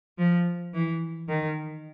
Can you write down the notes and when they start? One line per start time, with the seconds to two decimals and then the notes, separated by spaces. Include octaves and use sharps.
0.18 F3
0.74 E3
1.29 D#3